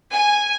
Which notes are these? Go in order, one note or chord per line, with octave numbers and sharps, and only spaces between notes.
G#5